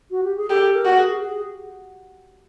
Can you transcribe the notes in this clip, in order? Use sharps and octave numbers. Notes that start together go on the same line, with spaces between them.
F#4
G4
G#4
G4 A4
A#4
F#4
G#4
G#4